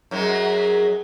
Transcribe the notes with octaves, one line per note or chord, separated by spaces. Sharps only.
F#2 F#3 G#3